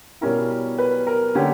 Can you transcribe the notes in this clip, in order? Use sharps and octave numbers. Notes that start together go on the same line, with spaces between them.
B2 G3 C#4 E4 A#4
B4
A#4
D3 A#3 C#4 G4